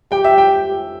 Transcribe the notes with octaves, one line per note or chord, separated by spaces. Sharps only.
G4 G5
E5
G5